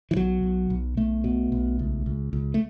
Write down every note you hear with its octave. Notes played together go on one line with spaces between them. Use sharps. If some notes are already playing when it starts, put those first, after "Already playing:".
E3
B1 F#3
B1
B1
B1 A3
B2
B1
C#2
C#2
C#2
A3